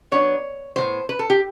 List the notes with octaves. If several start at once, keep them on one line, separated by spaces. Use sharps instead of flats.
F#3 B3 D4 C#5
A2 F#3 B3 C5
B4
A4
G4